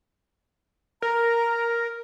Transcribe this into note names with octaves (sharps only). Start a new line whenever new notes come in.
A#4 A#5